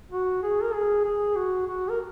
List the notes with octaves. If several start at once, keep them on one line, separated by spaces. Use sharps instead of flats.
F#4
G#4
A#4
G#4
G#4
F#4
F#4
A#4